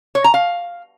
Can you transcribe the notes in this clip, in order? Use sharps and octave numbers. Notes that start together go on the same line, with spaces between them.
C#5
A#5
F5